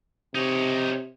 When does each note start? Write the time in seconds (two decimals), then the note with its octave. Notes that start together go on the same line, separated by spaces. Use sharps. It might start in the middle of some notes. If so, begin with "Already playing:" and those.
0.35 C3 D#4 C#5